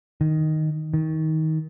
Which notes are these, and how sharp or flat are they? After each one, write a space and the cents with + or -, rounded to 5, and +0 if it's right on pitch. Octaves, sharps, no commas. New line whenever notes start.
D#3 +0
D#3 +25